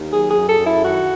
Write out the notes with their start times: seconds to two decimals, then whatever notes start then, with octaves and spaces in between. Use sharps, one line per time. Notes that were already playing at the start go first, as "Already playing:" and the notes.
Already playing: D#2
0.12 F#3 G#4
0.29 G#4
0.35 F#2
0.47 A4
0.59 F#2
0.65 E4
0.82 D#3 F#4